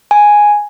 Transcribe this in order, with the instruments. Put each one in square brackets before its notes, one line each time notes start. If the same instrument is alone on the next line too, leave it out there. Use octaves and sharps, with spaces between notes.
[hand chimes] G#5